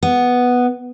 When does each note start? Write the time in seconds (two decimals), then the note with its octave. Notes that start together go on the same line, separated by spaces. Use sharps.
0.03 B3